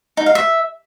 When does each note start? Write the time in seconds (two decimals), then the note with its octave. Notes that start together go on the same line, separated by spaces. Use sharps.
0.17 D#4
0.26 F5
0.35 E5